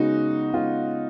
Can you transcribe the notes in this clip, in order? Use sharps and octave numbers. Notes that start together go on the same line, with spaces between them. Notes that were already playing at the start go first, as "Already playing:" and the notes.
Already playing: C#3 G#3 B3 D#4 F#4
C#3 G#3 B3 F4